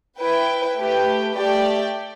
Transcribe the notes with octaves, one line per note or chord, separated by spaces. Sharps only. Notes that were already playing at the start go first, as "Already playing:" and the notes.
E4 B4 G5
A3 G4 B4 G5
A3 G4 D5 G5